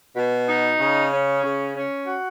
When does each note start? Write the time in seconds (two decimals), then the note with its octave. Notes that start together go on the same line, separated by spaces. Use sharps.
0.16 B2
0.48 D#4
0.80 C#3
1.12 C#4
1.44 C#3
1.76 C#4
2.07 F#4